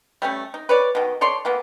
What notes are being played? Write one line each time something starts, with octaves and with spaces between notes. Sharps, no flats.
G3 A3 C#4
D#4
B4 C#5 D5
B2 D#3
A4 C#5 D5 C6
E3 A#3 B3